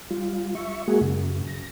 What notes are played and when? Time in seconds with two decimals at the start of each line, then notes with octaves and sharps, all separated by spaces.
0.11 G3 F4
0.55 E5 C#6
0.88 G#3 A#3 F#4 G#4
1.01 F#2 C#3
1.47 A#6